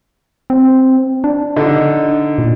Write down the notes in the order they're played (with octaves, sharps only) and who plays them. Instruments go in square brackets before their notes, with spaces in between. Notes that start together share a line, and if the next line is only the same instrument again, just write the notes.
[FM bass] C4
D4
[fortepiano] D3 D#4
[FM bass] A#2